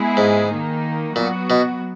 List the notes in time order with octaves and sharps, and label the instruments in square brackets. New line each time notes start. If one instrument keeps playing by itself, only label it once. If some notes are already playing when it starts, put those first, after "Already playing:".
Already playing: [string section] G#3 B3 E4 G#4
[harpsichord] G#2
[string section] D#3 A#3 D#4
[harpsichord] A#2 [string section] F#3 B3 F#4
[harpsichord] B2